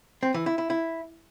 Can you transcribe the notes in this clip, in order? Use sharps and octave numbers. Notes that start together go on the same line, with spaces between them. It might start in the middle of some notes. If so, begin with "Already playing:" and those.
C4
E3
E4
E4
E4